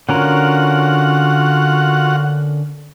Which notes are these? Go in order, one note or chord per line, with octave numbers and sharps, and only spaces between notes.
D3 C#4 F4 F#4 A#4 F#5